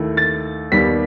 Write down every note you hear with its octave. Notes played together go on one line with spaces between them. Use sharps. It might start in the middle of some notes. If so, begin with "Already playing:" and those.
Already playing: D#2 D#3 A3 E4
A6
D#2 D#3 G3 B3 B6